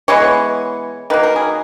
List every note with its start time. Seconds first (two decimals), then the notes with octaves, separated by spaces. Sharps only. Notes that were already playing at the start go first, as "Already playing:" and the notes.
0.08 E3 G#3 B3 C#5
1.10 D#3 F#3 A#3 B4
1.23 A#4
1.36 G#4